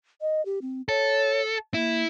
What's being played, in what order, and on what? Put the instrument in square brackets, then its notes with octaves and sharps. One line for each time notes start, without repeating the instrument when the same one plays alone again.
[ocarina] D#5
G4
C4
[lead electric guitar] A4 [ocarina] C#5
[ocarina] A#3 [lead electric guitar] E4